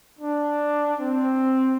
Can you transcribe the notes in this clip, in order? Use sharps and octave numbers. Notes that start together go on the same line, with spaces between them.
D4
C4